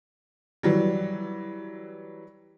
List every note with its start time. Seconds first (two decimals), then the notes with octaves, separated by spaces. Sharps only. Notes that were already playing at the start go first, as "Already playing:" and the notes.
0.63 E3 F#3 G3